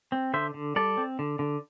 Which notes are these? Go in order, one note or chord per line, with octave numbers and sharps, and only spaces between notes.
C4
D3 C5 E5
D3
G3 A4 D5
C4
D3
D3